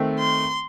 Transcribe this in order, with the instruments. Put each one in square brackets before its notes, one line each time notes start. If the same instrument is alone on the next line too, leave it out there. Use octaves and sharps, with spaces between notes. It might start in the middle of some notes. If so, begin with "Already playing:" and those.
Already playing: [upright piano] D#3 A3 C4
[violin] C6